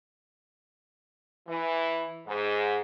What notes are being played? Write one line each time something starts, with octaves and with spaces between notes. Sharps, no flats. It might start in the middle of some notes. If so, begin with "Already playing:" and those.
E3
G#2